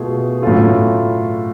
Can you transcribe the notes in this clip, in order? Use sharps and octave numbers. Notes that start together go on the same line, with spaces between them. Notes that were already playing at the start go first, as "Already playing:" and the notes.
Already playing: B2 A3 F4 G#4
A2 F#3 C#4 F4 A4